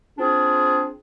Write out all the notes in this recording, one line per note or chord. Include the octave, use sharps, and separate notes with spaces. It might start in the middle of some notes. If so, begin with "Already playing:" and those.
C4 D4 F4 G#4